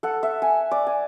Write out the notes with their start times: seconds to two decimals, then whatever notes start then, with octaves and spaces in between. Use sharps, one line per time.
0.03 A4 F#5
0.23 E5
0.42 G#5
0.71 D5
0.87 G#5